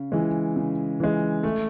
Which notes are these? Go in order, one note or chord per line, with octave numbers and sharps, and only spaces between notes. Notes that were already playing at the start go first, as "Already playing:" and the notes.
Already playing: C#3
E3 G#3
C#3
E3 G#3
A3